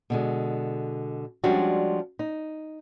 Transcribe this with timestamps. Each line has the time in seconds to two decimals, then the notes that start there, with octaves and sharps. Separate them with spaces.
0.10 B2 D3 G#3
1.44 F3 G3 G#3 C#4 D4 F#4
2.19 D#4